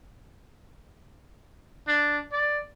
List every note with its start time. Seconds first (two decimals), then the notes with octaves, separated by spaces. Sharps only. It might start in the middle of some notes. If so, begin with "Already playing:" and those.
1.88 D4
2.32 D5